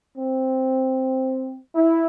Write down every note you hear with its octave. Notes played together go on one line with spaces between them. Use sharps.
C4
E4